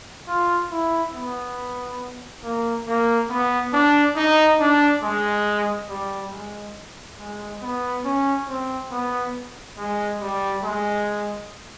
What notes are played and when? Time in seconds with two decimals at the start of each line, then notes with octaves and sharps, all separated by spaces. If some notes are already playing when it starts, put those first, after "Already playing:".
0.28 F4
0.71 E4
1.14 B3
2.43 A#3
2.87 A#3
3.30 B3
3.73 D4
4.16 D#4
4.59 D4
5.03 G#3
5.89 G3
6.32 G#3
7.19 G#3
7.62 B3
8.04 C#4
8.48 C4
8.91 B3
9.78 G#3
10.21 G3
10.63 G#3